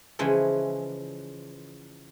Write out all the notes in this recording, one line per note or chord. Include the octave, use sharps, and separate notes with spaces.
C#3 E3 F3 G#3